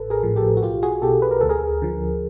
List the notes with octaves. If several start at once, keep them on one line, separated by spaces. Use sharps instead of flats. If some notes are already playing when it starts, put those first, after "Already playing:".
Already playing: A1 A4 B4
G#4 A#4
A2 F3
G4 A4
F#4
B1 F4 G4
F#4 G#4
B2 G4 A4
B4
A#4
D2 A4
G#4 A#4
D3 F3